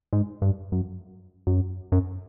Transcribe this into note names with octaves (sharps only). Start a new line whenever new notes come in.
G#2
G2
F#2
F#2
F#2